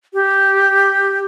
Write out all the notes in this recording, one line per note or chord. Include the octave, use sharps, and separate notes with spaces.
G4